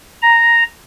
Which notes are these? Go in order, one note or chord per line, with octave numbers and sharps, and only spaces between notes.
A#5